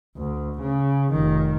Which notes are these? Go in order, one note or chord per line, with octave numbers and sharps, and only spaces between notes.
D2
C#3
F1 D#3